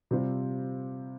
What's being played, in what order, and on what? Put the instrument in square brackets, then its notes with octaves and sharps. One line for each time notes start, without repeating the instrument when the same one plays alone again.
[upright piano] C3 G3 C4 F4